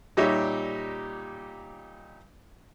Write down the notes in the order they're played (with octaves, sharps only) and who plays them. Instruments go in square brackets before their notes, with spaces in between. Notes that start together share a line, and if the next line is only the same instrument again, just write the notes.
[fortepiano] A#2 G3 D#4 G4 C#5 E5